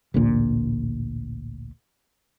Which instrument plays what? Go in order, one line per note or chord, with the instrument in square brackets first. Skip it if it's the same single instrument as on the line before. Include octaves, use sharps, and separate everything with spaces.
[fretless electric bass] A1 D2 A#2